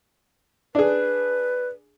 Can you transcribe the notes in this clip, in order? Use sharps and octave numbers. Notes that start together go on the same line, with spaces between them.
D4 G#4 B4